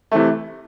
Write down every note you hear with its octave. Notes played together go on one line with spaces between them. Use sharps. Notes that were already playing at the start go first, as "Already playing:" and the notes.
C3 E3 A3